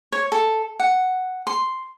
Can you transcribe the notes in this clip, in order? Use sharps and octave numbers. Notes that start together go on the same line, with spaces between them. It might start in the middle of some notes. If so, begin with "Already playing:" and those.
C#5
A4
F#5
C6